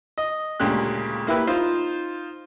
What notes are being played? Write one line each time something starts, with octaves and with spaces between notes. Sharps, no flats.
D#5
D2 A#2 C#3 G#3 G4 F#6
A#3 E4 G4 B4
D#4 F4 C5